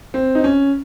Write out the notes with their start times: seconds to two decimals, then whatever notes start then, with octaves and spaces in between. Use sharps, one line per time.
0.14 C4
0.35 D#4
0.44 C#4